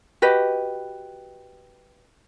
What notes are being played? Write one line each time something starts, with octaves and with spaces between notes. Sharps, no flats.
F#4 G4 B4 D#5